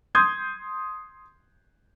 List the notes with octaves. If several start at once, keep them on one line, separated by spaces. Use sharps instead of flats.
C6 D#6 G6 G#6